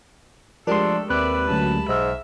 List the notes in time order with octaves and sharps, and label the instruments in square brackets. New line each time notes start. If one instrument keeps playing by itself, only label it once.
[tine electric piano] F3 C6 [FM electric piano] G#3 G4 A#4 [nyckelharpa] A3 A4 [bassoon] D4
[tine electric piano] D#2 C4 F#6 [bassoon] B4 [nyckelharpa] D5 E5
[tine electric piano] D2 F#3 C#4 [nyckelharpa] A5 B5
[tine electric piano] B1 E6 F6 [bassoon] G#2 [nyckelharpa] E5